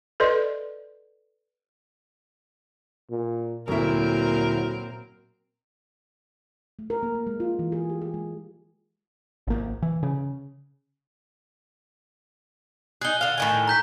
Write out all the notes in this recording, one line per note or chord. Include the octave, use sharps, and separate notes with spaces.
A4 B4 D5 D#5 C6
A#2
D2 A#2 F#3 C4 E4 A#4
A3
A#4
A#3
A#3
G#3
F4
E3
G#4
G4
G#4
G#3
G#1 A#3
E3
C#3
D#4 G#4 F#6 G7
D3 F5
A2 D#3 G#5
A#5 G6 B6